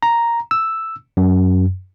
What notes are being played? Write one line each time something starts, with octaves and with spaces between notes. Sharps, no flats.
A#5
E6
F#2